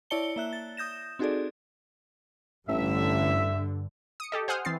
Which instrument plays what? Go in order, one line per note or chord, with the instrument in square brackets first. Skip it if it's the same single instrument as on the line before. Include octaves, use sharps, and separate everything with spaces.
[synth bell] E4 C#5 D5 A5 C#7 G7
A#3 E5 F#6 G7
A6
D#6 G6 A#6 E7
C4 D#4 F#4 G#4 A4 D5
[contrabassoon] A1 [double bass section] G2 D3 [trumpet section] E5
[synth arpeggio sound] D#6 C#7
G4 A4 D#5
C5 F#5 G#5 D#6 F6 G6
E3 C4 A6 C7